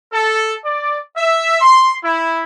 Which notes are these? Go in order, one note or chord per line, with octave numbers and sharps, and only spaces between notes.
A4
D5
E5
C6
E4